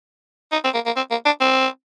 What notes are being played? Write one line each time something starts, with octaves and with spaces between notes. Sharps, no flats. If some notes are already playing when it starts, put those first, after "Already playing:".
D#4
C4
A#3
A#3
C4
A#3
D4
C4